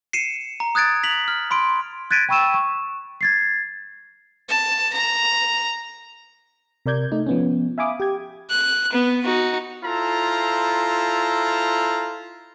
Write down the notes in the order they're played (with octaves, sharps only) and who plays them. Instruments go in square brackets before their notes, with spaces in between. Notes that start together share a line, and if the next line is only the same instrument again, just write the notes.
[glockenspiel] C7 C#7 D#7 E7
A#5
D#6 F#6 G#6 A6 D7
B6 F7 F#7
F6
B5 C6 D7
[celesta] F#6 G#6 A6 B6 D7 D#7
G5 B5 C#6 E6 D#7 E7
C#6
G#6 A6 C7
[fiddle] A5
A#5
[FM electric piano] C3 A#4 D5 G6 G#6
A3 D#4
F3 B3 C#4
E5 F5 G#5 B5 D6 D#6
G4 G5 G#6
[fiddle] F#6
B3
D#4 F#4
[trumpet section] E4 F4 A4 C5 A#5